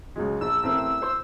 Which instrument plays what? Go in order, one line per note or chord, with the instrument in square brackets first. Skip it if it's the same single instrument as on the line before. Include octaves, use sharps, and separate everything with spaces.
[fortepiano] C#2 F#3 G#3
[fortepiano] A#1 [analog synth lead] E6
[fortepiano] A1 C4 A#4
C5 C6